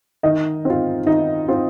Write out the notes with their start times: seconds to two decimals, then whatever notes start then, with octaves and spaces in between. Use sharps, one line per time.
0.23 D#3 D#4 D#5
0.65 C4 F4
1.06 D#3 D#4 D#5
1.48 C4 F4